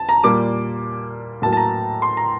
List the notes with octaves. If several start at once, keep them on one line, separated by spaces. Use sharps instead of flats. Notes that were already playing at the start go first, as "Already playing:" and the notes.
Already playing: A5
A#5
A#2 G3 A#3 D6
A2 F#3 A#3 A5
A5
A#5
C6
A#5